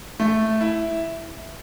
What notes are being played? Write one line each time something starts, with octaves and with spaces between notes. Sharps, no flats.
A3
E4